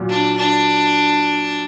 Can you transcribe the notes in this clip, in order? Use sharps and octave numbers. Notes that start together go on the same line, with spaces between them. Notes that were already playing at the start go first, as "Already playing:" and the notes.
Already playing: A#2 F#3 A#3
D4
D4